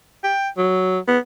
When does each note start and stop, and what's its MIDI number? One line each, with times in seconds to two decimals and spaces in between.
0.24 0.49 79
0.57 0.99 54
1.08 1.18 59